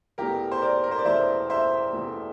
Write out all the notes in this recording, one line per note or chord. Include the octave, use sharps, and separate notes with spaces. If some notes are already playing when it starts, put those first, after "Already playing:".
E1 E2 E3 A3 G4 A#4
C5
A#4 D5
A#4
C5
D5
E1 E2 E3 A3 C5 E5
C5 E5
E1 E2 E3 A3